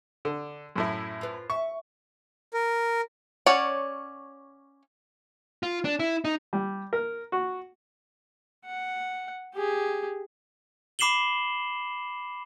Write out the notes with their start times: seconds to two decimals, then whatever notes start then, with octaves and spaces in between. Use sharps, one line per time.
0.25 D3
0.76 F#2 A2 E4
1.21 F4 B4
1.50 E5 C#6
2.54 A#4
3.46 C#4 C#5 D5 F#5
5.63 F4
5.85 D4
6.00 E4
6.25 D#4
6.53 G3
6.93 A#4
7.32 F#4
8.65 F#5
9.55 G4 G#4
10.99 B5 D6 C7 E7 F#7 G7